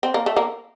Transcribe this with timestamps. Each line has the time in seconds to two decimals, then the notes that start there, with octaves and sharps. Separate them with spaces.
0.03 C4
0.14 A#3
0.26 A3
0.36 A#3